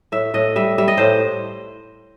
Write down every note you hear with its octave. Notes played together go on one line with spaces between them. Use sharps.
A2 E5
A2 D#5
G3 E5
G3 E5
D#5
A2 C5